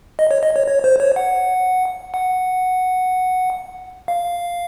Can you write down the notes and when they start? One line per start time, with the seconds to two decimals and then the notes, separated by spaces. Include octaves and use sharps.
0.19 D#5
0.31 C#5
0.43 D#5
0.56 C#5
0.67 C#5
0.84 C5
1.00 C#5
1.16 F#5
2.14 F#5
4.08 F5